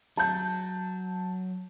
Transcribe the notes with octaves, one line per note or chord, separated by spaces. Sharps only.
F#3 A5 G6